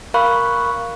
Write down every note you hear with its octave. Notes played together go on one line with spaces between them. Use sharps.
A#4 F5 B5 C#6 F#6